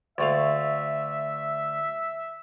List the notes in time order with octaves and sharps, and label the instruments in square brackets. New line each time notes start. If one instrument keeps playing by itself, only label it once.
[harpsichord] D2 A3 F5 [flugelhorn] E5